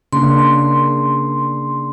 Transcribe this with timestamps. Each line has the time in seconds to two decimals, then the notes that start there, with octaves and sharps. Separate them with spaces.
0.13 C#3 A#3 D4 C6